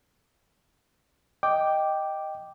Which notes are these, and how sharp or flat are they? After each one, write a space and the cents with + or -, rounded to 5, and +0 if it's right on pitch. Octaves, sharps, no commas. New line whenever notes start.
D#5 +0 G5 +0 D6 +0